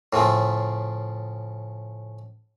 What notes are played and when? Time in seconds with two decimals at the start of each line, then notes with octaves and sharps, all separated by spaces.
0.13 A2 C#3 F3 A3